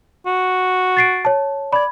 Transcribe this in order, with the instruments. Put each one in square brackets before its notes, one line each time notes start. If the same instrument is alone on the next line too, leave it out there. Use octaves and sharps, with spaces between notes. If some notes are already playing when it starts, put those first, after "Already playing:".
[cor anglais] F#4
[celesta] A6 C7 D7
C#5 A5
[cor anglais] D5 [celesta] B5 G#6